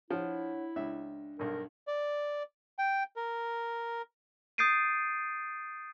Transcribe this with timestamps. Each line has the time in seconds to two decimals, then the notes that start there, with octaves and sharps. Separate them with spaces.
0.11 F3 D4 E4 C#5 F#5
0.76 C#2 D4 E5
1.39 B1 G2 A#4
1.87 D5
2.78 G5
3.16 A#4
4.58 D#6 G6 A6 C7 D7 D#7